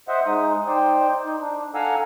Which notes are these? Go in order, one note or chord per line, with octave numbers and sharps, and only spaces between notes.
C5 D#5 E5 F#5
G#3 D#4 D#6
D#4 C5 D5 G5
D#4
D4
A4 F5 F#5 G#5 A#5 E6